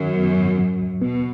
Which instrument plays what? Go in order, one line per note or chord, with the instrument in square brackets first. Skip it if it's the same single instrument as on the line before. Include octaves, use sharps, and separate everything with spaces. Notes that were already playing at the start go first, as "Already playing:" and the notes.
Already playing: [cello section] F#2 [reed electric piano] D#3
[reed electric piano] B3
G#2
F#3
D#2
[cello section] B2 [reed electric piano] B3